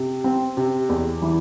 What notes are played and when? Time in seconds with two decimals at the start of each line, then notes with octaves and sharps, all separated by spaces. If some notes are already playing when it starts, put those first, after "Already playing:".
Already playing: C3
0.24 C4
0.57 C3
0.89 E2
1.22 E3